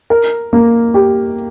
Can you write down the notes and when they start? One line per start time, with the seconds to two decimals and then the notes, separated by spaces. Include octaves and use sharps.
0.10 A#4
0.53 A#3
0.94 G4